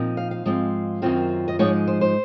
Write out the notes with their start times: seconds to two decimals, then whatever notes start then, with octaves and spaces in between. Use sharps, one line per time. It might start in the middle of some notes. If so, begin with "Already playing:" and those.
Already playing: A#2 F3 C4 D#4
0.17 F5
0.31 F5
0.45 G#2 F3 G#3 C4
1.02 F#2 D#3 F#3 C4 F4
1.48 D#5
1.59 G#2 F3 G#3 D#4 C#5
1.87 C5
2.01 C5